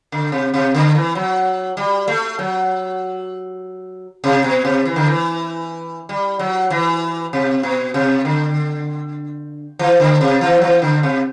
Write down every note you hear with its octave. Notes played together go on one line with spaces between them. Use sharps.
D3
C3
C3
D3
E3
F#3
G3
A3
F#3
C3
B2
C3
E3
D3
E3
G3
F#3
E3
C3
B2
C3
D3
E3
D3
C3
E3
F#3
E3
D3
C3